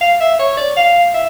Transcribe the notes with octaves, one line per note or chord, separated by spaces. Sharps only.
F5
E5
C#5
D5
F5
E5